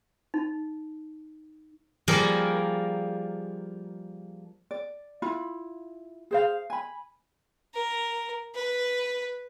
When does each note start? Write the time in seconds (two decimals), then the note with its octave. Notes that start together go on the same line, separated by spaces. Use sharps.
0.34 D#4
2.08 F3 G3 A#3 G#4 A#4
4.71 D5
5.22 E4 F4 B5
6.31 G#4 C5 F5
6.70 G#5 B5
7.74 A#4
8.55 B4